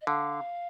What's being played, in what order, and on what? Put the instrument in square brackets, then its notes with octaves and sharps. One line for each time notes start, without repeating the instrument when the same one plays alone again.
[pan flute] D#5
[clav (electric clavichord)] D3 [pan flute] F5